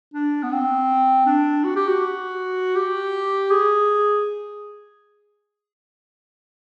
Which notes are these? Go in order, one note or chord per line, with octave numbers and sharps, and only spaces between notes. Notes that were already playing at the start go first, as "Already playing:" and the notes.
D4
B3
C4
D4
F#4
G4
F#4
G4
G#4